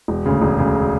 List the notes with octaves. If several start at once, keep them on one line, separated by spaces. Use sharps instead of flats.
E1
D2 C#3
E1
D2 C#3